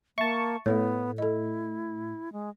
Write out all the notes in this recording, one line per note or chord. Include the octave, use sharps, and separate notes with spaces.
A#3 E5 A5 C#6
A2 A3 B3 A4 C#5
E4 A4 D#5
G#3